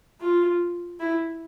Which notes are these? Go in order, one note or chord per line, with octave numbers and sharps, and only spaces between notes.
F4
E4